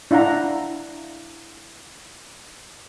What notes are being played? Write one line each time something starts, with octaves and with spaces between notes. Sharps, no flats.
D4 E4 F5 F#5 A#5